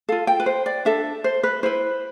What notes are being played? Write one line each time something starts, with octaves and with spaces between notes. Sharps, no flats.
F4 A4 F5
G5
B4
C5
D5
D4 A4 E5
C5
B4
E4 B4 C5